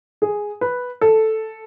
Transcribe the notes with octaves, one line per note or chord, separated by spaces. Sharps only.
G#4
B4
A4